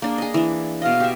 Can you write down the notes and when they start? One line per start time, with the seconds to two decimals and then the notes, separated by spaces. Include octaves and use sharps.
0.02 A#3 D4 G#4
0.18 G#4 D#5
0.34 E3 D4
0.82 B2 D#5 F5
1.00 G4 E5